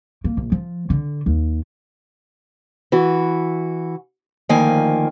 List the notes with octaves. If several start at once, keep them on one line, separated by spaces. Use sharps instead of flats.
A#3
A#1
F3
D3
D#2
E3 F#4
D2 D#3 F3 A#3 G#5